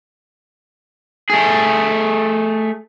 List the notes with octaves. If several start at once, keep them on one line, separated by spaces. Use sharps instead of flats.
A3 G#4